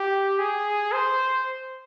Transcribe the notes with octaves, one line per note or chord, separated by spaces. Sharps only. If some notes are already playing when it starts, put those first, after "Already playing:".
Already playing: G4
G#4
C5